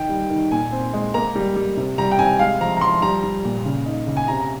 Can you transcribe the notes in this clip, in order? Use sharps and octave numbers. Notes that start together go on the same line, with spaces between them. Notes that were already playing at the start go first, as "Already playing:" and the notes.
Already playing: D#3 D#4 G5
G3
D#3
A#2 G#5
C4
G#3
A#3 A#5
G3
G3
C3
G3 A#5
G5
C3 G#5
G#3 F5
F3 A#5
A#5
F3 C6
G3 A#5
G3
A#2
C#3
D#4
C#3
G#5
C3 A#5
A#5